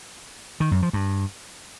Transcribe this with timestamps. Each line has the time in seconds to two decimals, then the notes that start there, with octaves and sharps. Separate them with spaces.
0.60 D#3
0.71 F#2
0.82 F3
0.93 G2